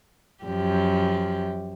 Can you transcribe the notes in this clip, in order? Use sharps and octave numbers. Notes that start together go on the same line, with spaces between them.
F#2 F3 G4